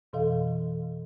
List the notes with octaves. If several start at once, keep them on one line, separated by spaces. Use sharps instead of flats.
F2 B2 E3 A4 D#5 F5